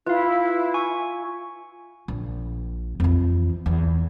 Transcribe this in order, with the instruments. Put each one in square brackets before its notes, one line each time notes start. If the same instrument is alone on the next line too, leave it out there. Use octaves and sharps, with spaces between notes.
[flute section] E4 [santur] F4 [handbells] B4 F5
[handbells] G#5 C#6
[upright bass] A#1
F2 E3
E2